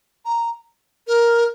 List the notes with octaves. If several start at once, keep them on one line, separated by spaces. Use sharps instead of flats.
A#5
A#4